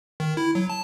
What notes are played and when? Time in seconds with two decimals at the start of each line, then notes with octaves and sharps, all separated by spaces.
0.20 D#3
0.37 E4
0.55 F#3
0.70 A5